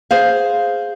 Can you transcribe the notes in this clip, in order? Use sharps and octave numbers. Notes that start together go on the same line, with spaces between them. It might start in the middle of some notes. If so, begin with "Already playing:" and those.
G#4 C5 F5